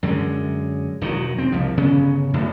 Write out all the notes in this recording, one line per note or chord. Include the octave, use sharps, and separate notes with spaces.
F#2 D3 G#3
E1 D#3 F#3
C4
C2 F3
G1 C#3 B3 C#4
D1 G1 E2 A2